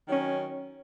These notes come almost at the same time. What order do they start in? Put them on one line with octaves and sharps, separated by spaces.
D#3 F#3 C#4